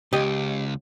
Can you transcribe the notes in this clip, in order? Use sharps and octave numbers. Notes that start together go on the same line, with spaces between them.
C#2 G4 D#5